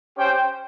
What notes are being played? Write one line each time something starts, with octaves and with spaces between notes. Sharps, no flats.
C#4 G4 C5 G5